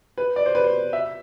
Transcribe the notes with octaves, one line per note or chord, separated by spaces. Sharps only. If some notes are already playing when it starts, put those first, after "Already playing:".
B4
D5
C5
B4
C5
E5